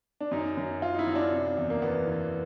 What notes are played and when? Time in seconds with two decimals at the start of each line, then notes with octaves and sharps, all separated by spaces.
0.21 D4
0.31 F#2 D#4
0.57 F#2
0.82 F#2 F4
0.94 D#4
0.99 E4
1.07 F#2
1.15 D4
1.32 C3
1.57 E2
1.70 A#3
1.82 E2 B3
2.07 E3